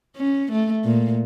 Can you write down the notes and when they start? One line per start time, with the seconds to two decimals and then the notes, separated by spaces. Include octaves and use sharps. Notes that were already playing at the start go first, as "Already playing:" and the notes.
0.16 C#4
0.52 A3
0.84 A#2